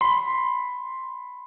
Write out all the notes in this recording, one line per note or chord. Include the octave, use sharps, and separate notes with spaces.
B5 C6